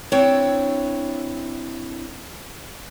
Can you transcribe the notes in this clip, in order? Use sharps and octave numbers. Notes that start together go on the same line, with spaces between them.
C4 D4 E4 C#5